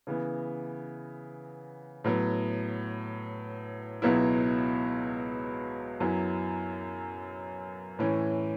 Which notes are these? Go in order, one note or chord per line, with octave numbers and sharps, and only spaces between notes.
C#3 E3 B3
A2 F#3 B3
C#2 B2 F#3 B3 E4
F#2 F#3 B3 E4
A2 E3 C#4